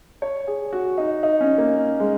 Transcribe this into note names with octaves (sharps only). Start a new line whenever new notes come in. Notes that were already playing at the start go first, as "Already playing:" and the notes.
C#5
G#4
F#4
D#4
D#4
C#4
A#3
G#3